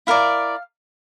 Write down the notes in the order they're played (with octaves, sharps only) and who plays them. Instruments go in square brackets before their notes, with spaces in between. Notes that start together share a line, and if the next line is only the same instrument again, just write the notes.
[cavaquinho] E4 A#4 D5 F5